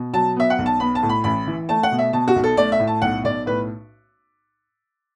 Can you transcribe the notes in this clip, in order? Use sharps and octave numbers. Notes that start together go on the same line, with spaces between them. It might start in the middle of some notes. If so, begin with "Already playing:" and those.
Already playing: B2
F#3 A5
B3 E5
F#5
B1
A5
B3 B5
A5
A2
B5
A1 B5
E3
A3 A5
F#5
B2
E5
B2 A5
F#4
B1
A4
A3 D5
E5
A2
A5
B1 F#5
B1 D5
A2 B4